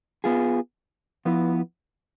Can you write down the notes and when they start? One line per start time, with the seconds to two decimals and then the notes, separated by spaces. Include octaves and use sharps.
0.24 B3 F4 G#4
1.25 F3 B3 E4 B4